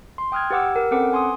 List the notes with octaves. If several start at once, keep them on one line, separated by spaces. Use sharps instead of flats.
C6
G5 D#6 F6 F#6 G#6
G4 B4 F#5 D6 E6
A#4
C4 C#4 A4 B4 F#5 D6
G#5 C6 D6 D#6